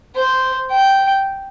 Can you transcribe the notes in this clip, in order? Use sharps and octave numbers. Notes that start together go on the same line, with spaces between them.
C5
G5